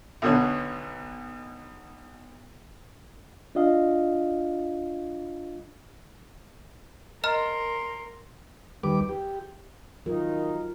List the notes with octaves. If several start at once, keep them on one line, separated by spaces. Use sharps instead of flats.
B1 B2 D3 C#5
D4 F4 D#5 F5
A#4 D#5 A#5 C6 F6
D#2 G3 B4 D6
G4
D#3 F#3 D#4 F4 A#4